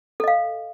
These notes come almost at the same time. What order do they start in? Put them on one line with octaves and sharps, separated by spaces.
A4 D#5 F5